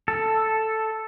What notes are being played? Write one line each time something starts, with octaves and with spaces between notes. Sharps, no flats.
A4